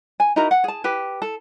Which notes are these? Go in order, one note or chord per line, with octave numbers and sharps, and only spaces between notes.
G#5
D#4 E4 F#4 A#4
F#5
G#4 A5
G4 B4
A4